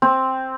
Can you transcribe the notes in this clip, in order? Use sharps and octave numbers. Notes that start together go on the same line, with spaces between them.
C4